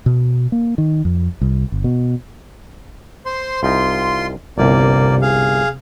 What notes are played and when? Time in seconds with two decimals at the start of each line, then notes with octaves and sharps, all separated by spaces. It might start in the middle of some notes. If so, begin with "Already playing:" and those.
0.06 B2
0.52 A#3
0.78 D#3
1.05 F2
1.41 C2
1.72 G1
1.84 B2
3.26 C5 C6
3.63 C2 D#4 F4 C6
4.58 G1 C2 C3 A#3 D5
5.22 G#4 F5